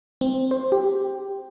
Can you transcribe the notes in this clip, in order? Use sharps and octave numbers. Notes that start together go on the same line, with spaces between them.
C4
C5
G4